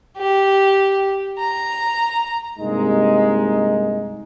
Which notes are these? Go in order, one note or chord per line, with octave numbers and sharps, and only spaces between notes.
G4
A#5
G2 C3 G#3 A#3 D#4